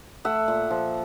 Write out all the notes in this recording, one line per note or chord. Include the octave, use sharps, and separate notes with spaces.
A3 E5 F#5
A#2
F3